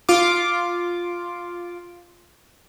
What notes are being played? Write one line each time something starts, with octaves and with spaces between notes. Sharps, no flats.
F4 D6